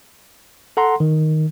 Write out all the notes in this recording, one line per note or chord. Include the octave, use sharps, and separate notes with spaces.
A4 F#5 A#5 C6
D#3